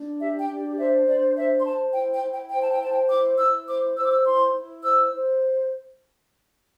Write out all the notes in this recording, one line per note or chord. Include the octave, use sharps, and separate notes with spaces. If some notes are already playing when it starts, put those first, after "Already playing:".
Already playing: D4
G4 E5
G5
D4
C5 E5
D4 D5
C5 E5
C6
C5 A5
E4 G5
G5
E4
G5
C5 G5
A5
G5
C5 A5
G5
E4 D6
E4 E6
C5 D6
C5 E6
D6
E6
E4 C6
E4
C5 E6
C5